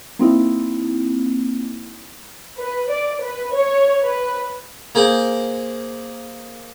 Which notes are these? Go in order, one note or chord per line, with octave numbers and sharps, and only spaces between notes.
A#3 C4 D#4 E4
B4
D5
B4
C#5
B4
A#3 G#4 C5